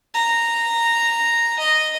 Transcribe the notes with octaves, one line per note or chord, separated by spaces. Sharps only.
A#5
D#5